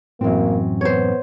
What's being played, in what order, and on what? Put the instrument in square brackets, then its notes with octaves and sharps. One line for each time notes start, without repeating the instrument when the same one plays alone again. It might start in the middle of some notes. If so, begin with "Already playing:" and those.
[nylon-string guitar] F#2 C4 [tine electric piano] A2 E3 [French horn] A#3
[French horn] B3 [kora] C5 C#5